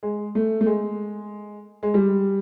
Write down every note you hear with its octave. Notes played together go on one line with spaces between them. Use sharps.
G#3
A3
A3
G#3
G#3
G3